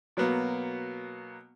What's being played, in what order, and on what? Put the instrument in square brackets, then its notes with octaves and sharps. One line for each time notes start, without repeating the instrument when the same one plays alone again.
[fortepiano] B2 F#3 A#3 B3